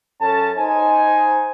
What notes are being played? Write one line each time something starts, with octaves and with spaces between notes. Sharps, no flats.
F#2 C#4 A4 A5
D#4 C5 G#5